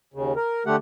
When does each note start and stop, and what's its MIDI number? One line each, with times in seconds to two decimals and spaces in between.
0.14 0.33 39
0.14 0.33 49
0.36 0.63 70
0.66 0.76 50
0.66 0.76 57
0.66 0.76 67
0.66 0.76 78